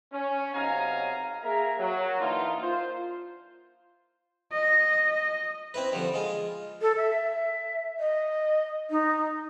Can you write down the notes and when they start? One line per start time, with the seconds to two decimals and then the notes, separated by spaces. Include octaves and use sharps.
0.13 C#4
0.54 B1 C3 D#4 F5 G#5 A#5
1.43 A#3 G#4 A#4 E5 A#5
1.78 F#3
2.19 E3 A#3 D4 D#4 F4
2.62 F4 C5
4.52 D#5
5.74 C4 E4 B4
5.93 D3 F3 G3
6.14 G#3 F4
6.82 A4
6.97 E5
8.00 D#5
8.91 D#4